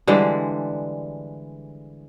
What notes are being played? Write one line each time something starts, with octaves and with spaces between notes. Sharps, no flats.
D3 E3 G3 G#3